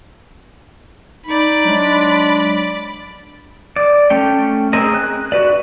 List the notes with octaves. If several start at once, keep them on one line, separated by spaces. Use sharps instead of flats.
D#4 D5 B5
F#3 G#3 D4
D5
A3 C#4 G5
C4 C#4 G#4 A#4 D#5
F#6
F#4 B4 D5